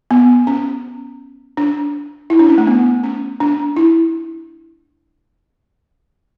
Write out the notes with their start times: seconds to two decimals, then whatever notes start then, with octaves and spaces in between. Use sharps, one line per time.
0.11 B3
0.47 C#4
1.57 D4
2.30 E4
2.39 D4
2.48 C#4
2.58 A3
2.67 B3
3.03 C#4
3.40 D4
3.76 E4